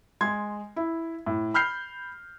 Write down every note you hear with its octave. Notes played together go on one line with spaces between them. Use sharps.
G#3 C6 G#6
E4
A2
B5 F6 G6 C7